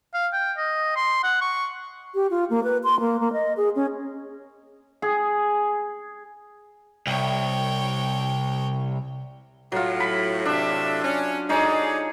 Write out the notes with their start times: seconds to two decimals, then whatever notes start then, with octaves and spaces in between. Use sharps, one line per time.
0.14 F5
0.32 G5
0.57 D#5
0.96 C6
1.24 F#5
1.41 C#6
2.15 G4
2.31 F4
2.50 A#3
2.64 B4
2.84 C6
3.00 A#3
3.20 A#3
3.33 D#5
3.57 G#4
3.76 C#4
5.02 G#4
7.07 C2 C#5 G5
9.72 A2 F#3 F4
10.00 B5
10.45 A2 C3 D4 E5
11.02 C#4
11.49 D3 G#3 D#4 G#4 C#5 D5